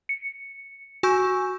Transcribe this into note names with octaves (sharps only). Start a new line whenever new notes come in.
C#7
F#4 G#5 C#6 E6 G6